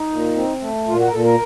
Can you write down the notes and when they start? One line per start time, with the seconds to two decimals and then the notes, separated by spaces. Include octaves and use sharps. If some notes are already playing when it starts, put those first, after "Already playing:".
Already playing: D#4
0.11 A#2
0.36 C4
0.61 A3
0.87 A#2 F4
0.99 F#4
1.08 A#4
1.12 A#2 A4
1.25 A#4